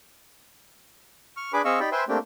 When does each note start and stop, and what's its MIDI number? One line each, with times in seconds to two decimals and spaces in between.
1.37 1.52 85
1.37 1.52 89
1.53 1.62 62
1.53 1.62 68
1.53 1.62 71
1.53 1.62 80
1.53 1.62 83
1.53 1.62 86
1.65 1.79 60
1.65 1.79 68
1.65 1.79 75
1.65 1.79 77
1.65 1.79 85
1.65 1.79 88
1.80 1.90 63
1.80 1.90 67
1.80 1.90 74
1.80 1.90 79
1.80 1.90 83
1.92 2.04 71
1.92 2.04 72
1.92 2.04 76
1.92 2.04 79
1.92 2.04 80
1.92 2.04 84
2.09 2.18 57
2.09 2.18 58
2.09 2.18 60
2.09 2.18 62
2.09 2.18 67
2.09 2.18 79